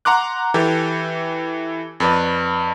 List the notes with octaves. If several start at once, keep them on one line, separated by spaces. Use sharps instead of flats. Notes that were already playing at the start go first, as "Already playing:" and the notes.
F#5 A#5 C6 D6 F#6
E3 G4 A4
F2 B4 D5